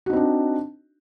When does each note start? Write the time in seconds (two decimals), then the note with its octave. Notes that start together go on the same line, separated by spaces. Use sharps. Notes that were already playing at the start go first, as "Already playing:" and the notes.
0.06 F#4
0.10 D#4
0.13 C4
0.16 D4